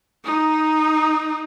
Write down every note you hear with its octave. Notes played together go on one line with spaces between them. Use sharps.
D#4